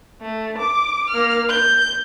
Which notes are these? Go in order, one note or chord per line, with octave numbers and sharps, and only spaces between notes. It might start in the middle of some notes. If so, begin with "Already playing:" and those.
A3
D6
A#3 F6
G6